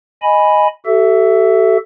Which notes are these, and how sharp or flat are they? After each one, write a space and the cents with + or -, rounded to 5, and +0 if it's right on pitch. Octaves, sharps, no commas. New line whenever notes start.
D#5 +0 G#5 +0 B5 +0
F#4 +45 A4 +0 E5 +10